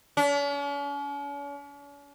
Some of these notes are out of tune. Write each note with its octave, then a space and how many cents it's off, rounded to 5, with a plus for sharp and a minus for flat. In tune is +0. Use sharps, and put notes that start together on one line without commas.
C#4 +45